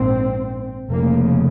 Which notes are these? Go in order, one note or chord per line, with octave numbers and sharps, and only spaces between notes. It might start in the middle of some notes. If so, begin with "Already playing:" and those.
Already playing: A#1 G#2 C4
F1 F2 C#3 A#3